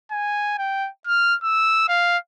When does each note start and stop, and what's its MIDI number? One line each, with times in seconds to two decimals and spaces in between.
0.11 0.57 80
0.58 0.89 79
1.07 1.35 89
1.43 1.86 88
1.89 2.18 77